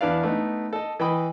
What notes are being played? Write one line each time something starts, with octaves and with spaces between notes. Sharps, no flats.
E2 D4 E4 B4 D5 F5
A3 B3 D#4
A4 D#5
E3 D#5 G5 B5 D#6